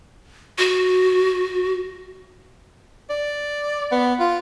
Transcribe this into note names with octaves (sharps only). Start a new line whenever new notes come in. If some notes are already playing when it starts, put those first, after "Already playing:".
F#4
D5
B3
F4